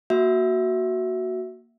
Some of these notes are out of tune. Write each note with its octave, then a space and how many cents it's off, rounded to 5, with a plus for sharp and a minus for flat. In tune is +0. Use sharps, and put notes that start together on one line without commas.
A#3 +0 F#4 +0 E5 +0